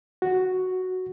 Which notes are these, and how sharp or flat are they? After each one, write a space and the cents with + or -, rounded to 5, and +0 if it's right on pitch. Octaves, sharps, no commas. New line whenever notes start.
F#4 +0